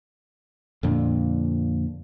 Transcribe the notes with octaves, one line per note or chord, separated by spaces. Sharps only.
F2 A#2 D3